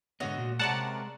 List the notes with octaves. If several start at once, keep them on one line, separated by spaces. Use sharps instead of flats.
G#2 D3 B3 F#4 C#5 D#5
A#2
C3 G#3 C#4 A#4 D5 F#5 A5